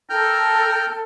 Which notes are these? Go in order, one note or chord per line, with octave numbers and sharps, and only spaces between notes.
A4 A#4 G5 F6 G6